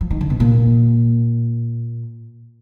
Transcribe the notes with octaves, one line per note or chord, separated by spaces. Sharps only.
F3
D#3
D3
B2
A#2